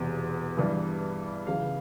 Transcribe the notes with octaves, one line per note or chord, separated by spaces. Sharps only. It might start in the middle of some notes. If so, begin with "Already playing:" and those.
Already playing: E1 E2 C3
G2 E3 G3
C#2 C#3 E3 F5